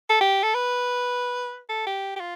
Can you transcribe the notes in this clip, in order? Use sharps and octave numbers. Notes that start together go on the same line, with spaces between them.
A4
G4
A4
B4
A4
G4
G4
F4